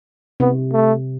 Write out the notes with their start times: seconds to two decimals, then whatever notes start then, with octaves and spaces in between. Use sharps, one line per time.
0.40 C3 B3
0.73 A3